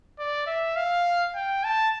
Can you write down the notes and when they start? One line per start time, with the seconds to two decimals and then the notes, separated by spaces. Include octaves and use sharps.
0.19 D5
0.47 E5
0.76 F5
1.35 G5
1.64 A5